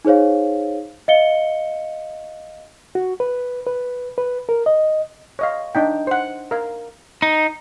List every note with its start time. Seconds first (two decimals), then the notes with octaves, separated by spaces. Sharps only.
0.05 D#4 G#4 C5 C#5 F5
1.08 D#5 F5 C#7 G7
2.95 F#4
3.20 B4
3.67 B4
4.18 B4
4.49 A#4
4.66 D#5
5.39 C#5 D#5 F5
5.75 D4 D#4 G5
6.07 C5 F#5
6.51 A#4 F5
7.22 D#4